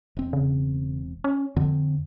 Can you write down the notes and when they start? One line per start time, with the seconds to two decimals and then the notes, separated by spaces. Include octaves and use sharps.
0.17 E1 C4
0.33 C#3
1.24 C#4
1.56 F2 D3 C4